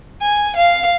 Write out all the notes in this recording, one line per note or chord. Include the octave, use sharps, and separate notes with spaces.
G#5
F5